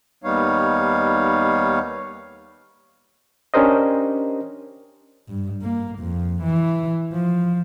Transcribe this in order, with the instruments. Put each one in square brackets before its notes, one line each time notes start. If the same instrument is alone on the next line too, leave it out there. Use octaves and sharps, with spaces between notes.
[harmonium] D#2 G3 B3 D#4 C#5 F5
[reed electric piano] C#4 D4 G4 A#4 C5 D#5
[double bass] G2
A#3
F2
E3
F3